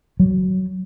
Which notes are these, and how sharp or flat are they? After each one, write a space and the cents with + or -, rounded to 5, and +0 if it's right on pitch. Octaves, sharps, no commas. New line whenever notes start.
F#3 +15